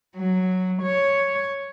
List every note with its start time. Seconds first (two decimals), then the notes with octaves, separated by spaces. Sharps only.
0.16 F#3
0.82 C#5